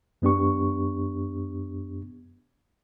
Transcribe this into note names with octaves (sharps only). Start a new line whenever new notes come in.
F#2 B3 D4 G4 C#6